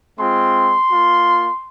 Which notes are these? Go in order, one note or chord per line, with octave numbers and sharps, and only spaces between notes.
G#3 C4 F4 C6
A#3 F4